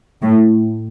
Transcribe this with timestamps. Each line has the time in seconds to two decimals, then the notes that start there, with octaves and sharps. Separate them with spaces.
0.22 A2